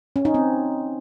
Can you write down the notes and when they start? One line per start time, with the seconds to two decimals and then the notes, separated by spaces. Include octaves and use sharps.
0.16 C#4
0.25 D#4
0.34 C4